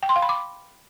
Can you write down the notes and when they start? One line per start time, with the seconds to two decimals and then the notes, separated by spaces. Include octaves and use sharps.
0.03 G5
0.09 C6
0.16 F5
0.22 B5
0.29 D6